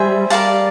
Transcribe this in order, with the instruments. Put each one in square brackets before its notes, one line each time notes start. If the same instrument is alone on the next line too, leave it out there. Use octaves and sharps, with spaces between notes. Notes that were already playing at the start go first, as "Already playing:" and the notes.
Already playing: [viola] G3 [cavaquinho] G#4 C5 E5
[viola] G3 [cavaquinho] A#4 D5 F5 A5